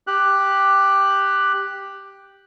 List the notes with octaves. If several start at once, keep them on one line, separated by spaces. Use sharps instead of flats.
G4 F#6